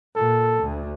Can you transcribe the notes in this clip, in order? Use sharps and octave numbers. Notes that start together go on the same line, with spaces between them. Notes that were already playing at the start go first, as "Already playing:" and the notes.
A#2 A4
D2